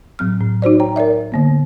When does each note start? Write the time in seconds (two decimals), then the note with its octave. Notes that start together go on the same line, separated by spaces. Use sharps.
0.19 A2 F#3 C4 F6
0.40 A2
0.62 D#4 F#4 C5 D5
0.80 C#5 G5 A#5
0.96 A#4 C#5 D5 E5
1.32 D3 A#3 B3